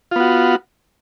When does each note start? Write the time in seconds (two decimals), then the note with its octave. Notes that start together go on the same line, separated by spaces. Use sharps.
0.11 F4
0.16 B3
0.20 F#4